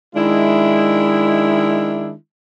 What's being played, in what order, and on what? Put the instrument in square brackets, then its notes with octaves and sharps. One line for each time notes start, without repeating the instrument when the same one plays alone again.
[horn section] D#3 G#3 D4 E4